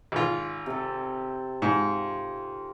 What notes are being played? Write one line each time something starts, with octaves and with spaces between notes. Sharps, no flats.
G#1 F4
C3 A4
G#2 F4